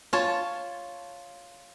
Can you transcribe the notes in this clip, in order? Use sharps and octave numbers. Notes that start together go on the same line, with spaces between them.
F4 C#5 A5